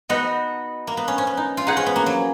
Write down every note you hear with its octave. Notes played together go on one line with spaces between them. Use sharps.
B3 D#4 F#4 B4
A#3
B3
C#4
C#4
B3
D#4
F4
D#4 G#4 B4 F#5
C#4
B3
A#3
F#3